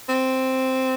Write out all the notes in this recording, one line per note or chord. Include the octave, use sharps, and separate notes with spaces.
C4